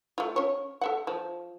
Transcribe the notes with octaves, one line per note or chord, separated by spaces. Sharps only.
A3 F4
C#4 C#5
A4 E5 F#5
F3